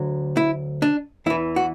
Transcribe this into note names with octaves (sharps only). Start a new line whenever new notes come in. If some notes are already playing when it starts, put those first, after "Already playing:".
Already playing: D2 D3 F#3
E4
D4
E2 E3 E4
F#4